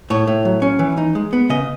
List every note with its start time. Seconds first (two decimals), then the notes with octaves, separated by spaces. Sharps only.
0.10 A2 C#5
0.27 A2
0.45 F#3
0.62 C#4
0.79 E3
0.97 D#4
1.15 G#3
1.33 B3
1.50 C#3 D#5